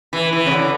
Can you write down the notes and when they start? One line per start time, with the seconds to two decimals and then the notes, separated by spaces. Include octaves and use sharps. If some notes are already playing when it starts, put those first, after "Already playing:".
0.13 E3
0.33 E3
0.46 C#3
0.51 D3